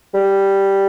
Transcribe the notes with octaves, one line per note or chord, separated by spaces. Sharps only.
G3